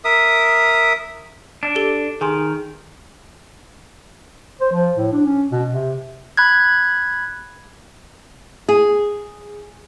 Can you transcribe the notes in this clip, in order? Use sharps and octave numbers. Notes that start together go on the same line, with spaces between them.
A#4 E5 D#6
D4
G4 A4 G7
D#3 G#4 G#5 C6
C5
F3
A2
D4
C#4
B2
C3
B5 F#6 G#6
G#4